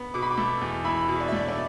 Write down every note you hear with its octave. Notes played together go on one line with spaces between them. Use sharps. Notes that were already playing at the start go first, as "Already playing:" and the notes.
Already playing: B3
B2 D6
B5
D6
A3
E2
E4 B5
B2
D5
E5
A3 D5
D5